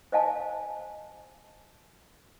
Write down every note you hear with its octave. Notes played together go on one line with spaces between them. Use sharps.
C5 D#5 F5 G#5 A5